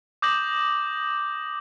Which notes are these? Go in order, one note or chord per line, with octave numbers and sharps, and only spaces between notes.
D6 D#6 G6 A#6 F#7